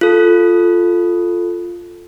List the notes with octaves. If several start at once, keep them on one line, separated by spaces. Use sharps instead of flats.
F4 A4